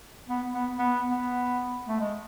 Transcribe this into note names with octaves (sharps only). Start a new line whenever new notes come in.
B3
B3
B3
B3
A3
G#3